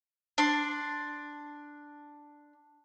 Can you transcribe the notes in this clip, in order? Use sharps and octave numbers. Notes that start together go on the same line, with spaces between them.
D4 C6